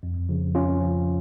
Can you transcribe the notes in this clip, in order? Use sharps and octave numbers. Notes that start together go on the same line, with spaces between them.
F2
C#3 F3
F2 C#4 F4
C#3 F3